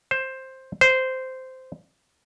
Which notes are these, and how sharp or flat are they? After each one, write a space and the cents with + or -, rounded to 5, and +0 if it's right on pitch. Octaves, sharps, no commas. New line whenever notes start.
C5 +10
C5 -10